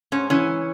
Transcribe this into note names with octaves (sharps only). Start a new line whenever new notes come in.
G#2 C#4
E3 C#4